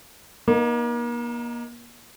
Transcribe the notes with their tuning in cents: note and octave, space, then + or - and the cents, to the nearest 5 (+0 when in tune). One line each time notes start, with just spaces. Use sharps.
A#3 +35 D#4 +0